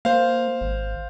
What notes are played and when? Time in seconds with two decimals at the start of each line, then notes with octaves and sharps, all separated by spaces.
0.05 A#3 C5 F5
0.61 G#1